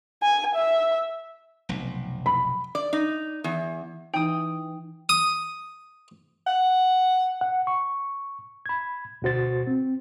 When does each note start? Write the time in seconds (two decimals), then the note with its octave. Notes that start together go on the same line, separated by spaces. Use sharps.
0.22 G#5
0.55 E5
1.69 F1 B1
2.26 B5
2.75 D5
2.93 D#4
3.44 E2
4.14 E3 D#4 G5 D#6
5.09 D#6
6.47 F#5
7.41 F#5
7.67 C#6
8.66 B5 G#6
9.22 D2 B2 F#4 C5 A6
9.67 C4